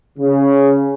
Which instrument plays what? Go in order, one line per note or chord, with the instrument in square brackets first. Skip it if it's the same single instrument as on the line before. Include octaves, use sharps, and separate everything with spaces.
[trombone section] C#3